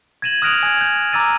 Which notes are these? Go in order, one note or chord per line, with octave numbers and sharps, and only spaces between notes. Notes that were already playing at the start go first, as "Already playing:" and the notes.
G#6 A#6 D#7 E7 F#7
D#6 F6 F#6 A#6 D7 F7
G#5 G#6
G6
A#5 D6 E6 A6 D#7